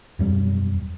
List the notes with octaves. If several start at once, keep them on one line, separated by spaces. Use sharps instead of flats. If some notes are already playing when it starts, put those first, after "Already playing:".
E1 F#2 G3